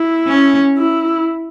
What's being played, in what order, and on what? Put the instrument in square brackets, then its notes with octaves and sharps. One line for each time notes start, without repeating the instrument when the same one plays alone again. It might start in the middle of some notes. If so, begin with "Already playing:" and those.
Already playing: [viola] E4
[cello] C#4
[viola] E4